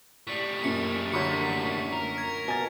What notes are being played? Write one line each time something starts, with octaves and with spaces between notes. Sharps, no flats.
A2 G3 B6
F#2 A#2 C#7
D2 F#3 C#6 B6 C#7
A#4
G#6
B2 G#5 A6